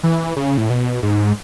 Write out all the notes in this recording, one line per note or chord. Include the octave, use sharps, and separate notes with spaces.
E3
C#3
A2
B2
G#2